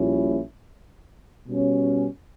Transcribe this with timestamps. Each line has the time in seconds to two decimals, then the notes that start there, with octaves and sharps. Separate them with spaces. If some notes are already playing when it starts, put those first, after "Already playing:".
Already playing: A#1 A#2 G3 C#4 E4
1.48 B2 G3 C#4